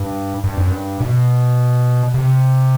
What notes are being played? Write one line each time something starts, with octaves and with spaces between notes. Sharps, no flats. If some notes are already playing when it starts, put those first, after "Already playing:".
Already playing: G2
G2
F#2
G2
B2
C3